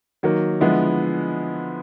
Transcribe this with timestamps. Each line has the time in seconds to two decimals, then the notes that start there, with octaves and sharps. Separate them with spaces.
0.23 D#3 F#3 A#3
0.61 D3 F3 G#3 B3 E4